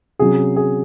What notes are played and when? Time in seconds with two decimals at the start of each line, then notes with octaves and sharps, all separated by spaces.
0.19 C3 F#3 C#4 G#4
0.56 G#4